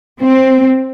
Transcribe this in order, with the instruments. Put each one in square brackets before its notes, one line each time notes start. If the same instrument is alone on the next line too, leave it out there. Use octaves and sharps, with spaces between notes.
[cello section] C4